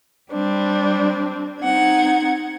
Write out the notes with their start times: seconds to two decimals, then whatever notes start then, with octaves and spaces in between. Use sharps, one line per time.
0.32 G3 C4 D4
1.62 C4 D#4 F#5 G#6